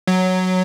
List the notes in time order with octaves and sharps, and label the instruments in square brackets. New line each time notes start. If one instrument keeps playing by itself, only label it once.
[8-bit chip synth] F#3